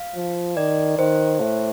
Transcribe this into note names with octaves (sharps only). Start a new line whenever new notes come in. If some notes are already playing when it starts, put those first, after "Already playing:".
Already playing: F5
F3
D#3 D5
D#3 C5
A2